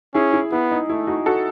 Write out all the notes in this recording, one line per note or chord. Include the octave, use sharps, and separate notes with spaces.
C#4 E4 G#4
E4
B3 E4
D#4
A3 E4
D#4 F#4
F#4 A4